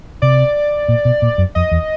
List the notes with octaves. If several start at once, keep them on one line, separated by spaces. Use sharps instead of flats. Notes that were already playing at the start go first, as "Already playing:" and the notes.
C3 D5
A#2
B2
A#2
F#2
F2 D#5
E2